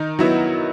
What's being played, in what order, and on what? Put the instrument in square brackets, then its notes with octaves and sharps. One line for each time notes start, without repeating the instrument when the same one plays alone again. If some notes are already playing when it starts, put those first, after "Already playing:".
Already playing: [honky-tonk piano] D#3 D#4
F#3 B3 E4